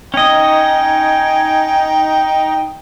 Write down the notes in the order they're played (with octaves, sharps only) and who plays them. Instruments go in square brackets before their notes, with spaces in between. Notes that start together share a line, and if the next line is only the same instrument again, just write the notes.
[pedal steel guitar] C#4 D#5 [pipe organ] D#4 [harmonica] G5 [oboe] G#5